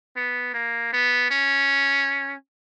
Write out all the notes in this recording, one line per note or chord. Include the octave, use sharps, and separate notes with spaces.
B3
A#3
B3
C#4